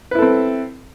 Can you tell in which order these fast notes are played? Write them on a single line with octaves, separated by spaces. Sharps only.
B4 E4 A4 C4